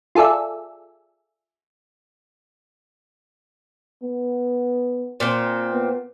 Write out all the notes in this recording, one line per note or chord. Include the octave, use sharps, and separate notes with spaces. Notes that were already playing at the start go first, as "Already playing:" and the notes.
F4 G#4 A4 D5 E5
B3
A#2 C4
B3